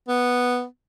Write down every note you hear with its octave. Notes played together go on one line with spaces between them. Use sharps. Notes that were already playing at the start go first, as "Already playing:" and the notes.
B3